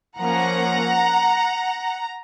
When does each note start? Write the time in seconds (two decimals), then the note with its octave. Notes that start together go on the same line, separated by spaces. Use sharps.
0.18 F3 A#3 C#4 F#5 A#5